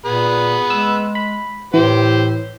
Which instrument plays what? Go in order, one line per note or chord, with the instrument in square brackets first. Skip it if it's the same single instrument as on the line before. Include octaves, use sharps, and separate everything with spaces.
[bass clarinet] A#2 [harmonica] B3 G#4 B4
[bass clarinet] G#3 [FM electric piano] E6
[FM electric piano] B5
[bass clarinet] A2 [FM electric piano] E3 [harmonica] G4 C5